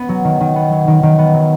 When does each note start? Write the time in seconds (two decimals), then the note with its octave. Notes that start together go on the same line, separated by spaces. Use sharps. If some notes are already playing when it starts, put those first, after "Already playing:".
Already playing: B3
0.09 F#3
0.24 D#3
0.40 D#3
0.56 B3
0.72 F#3
0.88 D#3
1.03 D#3
1.19 B3
1.34 F#3